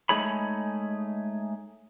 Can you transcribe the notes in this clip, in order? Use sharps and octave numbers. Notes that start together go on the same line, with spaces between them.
G#3 A3 D#4 G#4 C#5 B5